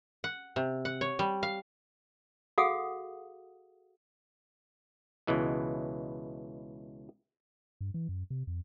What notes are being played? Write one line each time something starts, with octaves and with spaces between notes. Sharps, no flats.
F#5
C3
F#5
C#5
G3
F5
F#4 G#4 A4 F5 F#5 D#6
C#2 B2 E3 G#3
G2
E3
F#2
C3
F2